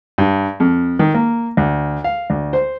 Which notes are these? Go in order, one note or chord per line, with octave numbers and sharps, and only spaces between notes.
G2
F2
D#3
A#3
D2
F5
D2
C5